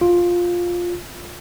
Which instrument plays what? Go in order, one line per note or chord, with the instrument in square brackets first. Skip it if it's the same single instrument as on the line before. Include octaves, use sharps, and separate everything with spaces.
[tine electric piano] F4